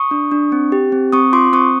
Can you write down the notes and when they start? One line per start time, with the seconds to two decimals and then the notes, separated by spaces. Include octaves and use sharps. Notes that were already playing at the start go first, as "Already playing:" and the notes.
Already playing: C#6 D#6
0.11 D4
0.31 D4
0.52 C4
0.72 G4
0.92 C4
1.13 C4 C#6 D#6
1.33 F4 C6 D6
1.53 C4 C#6 D#6